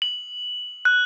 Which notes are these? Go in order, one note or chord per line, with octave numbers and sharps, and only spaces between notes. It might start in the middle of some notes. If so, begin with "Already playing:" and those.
F#7
F#6